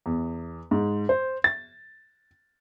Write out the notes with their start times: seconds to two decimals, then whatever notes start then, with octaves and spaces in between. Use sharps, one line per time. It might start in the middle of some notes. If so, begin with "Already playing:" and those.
0.06 E2
0.71 G#2
1.09 C5
1.44 A6